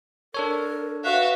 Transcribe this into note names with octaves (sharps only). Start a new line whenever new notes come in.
D4 A4 A#4 C#5
F#4 B4 E5 F5